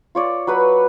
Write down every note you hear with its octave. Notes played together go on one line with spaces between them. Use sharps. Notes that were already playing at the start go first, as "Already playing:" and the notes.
F4 C#5 D5
F#3 B4 B5